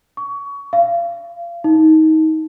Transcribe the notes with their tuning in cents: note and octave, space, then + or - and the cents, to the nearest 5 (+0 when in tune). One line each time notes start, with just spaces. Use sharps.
C#6 +25
F5 -30
D#4 +25